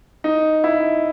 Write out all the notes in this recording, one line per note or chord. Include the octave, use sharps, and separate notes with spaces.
D#4
E4